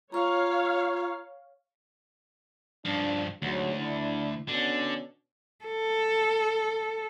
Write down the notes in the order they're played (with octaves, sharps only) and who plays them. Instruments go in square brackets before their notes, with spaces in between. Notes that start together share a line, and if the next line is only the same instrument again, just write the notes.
[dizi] F4 [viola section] C#5 F5 [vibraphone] A#5 C#6
[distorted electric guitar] G2 F3 [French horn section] D4
[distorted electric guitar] D2 [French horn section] G#2 C3 F#3
[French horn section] D4 E4
[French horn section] B2 C#4 D4 [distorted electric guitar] D3
[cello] A4